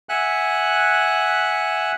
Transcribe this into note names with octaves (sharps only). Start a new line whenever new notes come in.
E5 F#5 G#5 F#6